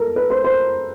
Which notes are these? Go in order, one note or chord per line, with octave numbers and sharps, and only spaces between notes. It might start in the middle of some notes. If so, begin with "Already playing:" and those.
Already playing: A4 A#4
B4
C5
C5